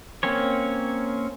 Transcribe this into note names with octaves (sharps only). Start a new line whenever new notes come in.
A#3 C4 C#4 C#5